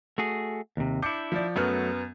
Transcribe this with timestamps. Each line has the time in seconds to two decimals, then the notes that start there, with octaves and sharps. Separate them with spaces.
0.18 A3 F#4 G#4
0.77 D#2 C3
1.02 D4 E4 D6 G6 C#7
1.32 F3 D5
1.56 F#2 F#3 A3 B3 F#4 F6